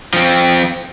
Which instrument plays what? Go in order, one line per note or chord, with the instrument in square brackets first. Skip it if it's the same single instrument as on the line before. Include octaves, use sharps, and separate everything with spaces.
[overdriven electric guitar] F3 C4